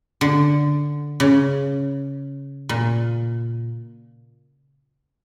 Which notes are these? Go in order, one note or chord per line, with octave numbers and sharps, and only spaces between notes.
D3
C#3
A#2